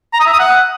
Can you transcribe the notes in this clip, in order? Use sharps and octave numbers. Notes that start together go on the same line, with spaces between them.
A#5
D#6
E5
D#6
F#5